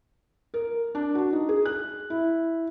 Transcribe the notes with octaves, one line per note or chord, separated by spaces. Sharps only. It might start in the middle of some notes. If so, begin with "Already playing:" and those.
A#4
D4
F#4
D#4
G#4
F#6
E4